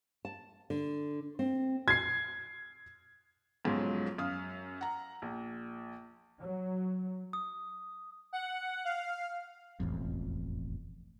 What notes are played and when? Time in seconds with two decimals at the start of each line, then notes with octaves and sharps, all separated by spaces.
0.25 A5
0.70 D3
1.39 C4
1.88 G#6 C7
3.65 B1 G#2 C#3 F3 F#3
4.18 F#2 F5 D#6 F6
4.81 F#5 A#5
5.22 A#1
6.41 F#3
7.33 D#6
8.33 F#5
8.85 F5
9.80 E1 A1 F2